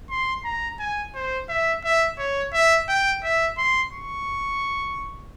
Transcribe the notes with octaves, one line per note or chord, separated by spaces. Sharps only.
C6
A#5
G#5
C5
E5
E5
C#5
E5
G5
E5
C6
C#6